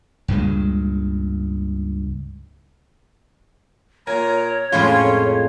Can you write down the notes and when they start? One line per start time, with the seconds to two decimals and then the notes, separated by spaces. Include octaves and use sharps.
0.28 C#2 G2 A#2 G#3
4.07 A#2 A#4 C#5 G#5 A#5
4.72 F2 A2 G#3 C#4 F4